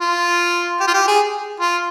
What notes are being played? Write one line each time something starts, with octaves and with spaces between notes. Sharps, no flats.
F4
G4
F4
G4
G#4
F4